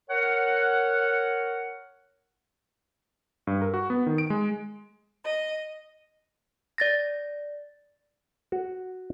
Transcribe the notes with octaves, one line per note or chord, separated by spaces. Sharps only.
A#4 C#5 F#5
G2
A#4
F#4
B3
D#3
D7
G#3
D#5
D5 A6 A#6
F#4